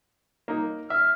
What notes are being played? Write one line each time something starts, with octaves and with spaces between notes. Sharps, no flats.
A#3 D#4
E5 F6